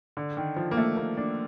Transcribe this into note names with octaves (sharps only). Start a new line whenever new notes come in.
D3
D#3
F3
A#3
A3
A#3
D4